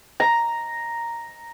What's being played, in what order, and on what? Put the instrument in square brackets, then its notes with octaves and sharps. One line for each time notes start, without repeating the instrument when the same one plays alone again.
[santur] A#5